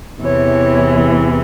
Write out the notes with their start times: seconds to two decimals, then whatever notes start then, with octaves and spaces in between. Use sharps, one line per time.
0.22 E2 C3 E3 C#5